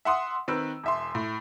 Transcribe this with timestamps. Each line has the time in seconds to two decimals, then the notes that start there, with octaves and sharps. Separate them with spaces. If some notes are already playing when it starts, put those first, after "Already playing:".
0.05 E5 F#5 C6 D#6
0.48 D#3 C4 B4 E6
0.84 E1 E5 C6
1.15 A2